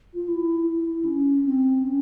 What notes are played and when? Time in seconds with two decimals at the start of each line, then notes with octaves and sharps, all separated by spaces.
0.14 F4
0.28 E4
0.67 E4
1.05 C#4
1.44 C4
1.82 C#4